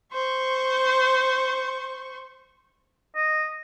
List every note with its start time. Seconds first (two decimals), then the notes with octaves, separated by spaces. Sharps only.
0.13 C5 C#6
3.15 D#5